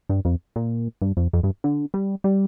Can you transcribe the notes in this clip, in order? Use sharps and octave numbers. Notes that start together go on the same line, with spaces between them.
G2
F2
A#2
G2
F2
F2
G2
D3
G3
G3